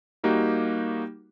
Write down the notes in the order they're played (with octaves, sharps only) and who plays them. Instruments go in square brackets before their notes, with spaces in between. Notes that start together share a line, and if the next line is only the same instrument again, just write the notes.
[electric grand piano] G3 A#3 D#4 F#4 G4